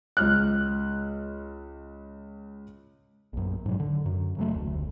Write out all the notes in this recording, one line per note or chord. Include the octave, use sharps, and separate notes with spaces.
C#2 F6 F#6
A#1 F#2
G#2 B2 F#3
D3
F#2
C#3 F#3 A3
F1 D2